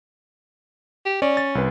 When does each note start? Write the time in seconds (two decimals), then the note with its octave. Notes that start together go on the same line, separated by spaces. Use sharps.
1.05 G4
1.22 C#4 D5
1.37 A6
1.55 C2 B4